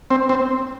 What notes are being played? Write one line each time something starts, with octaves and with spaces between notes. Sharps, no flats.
C4
C4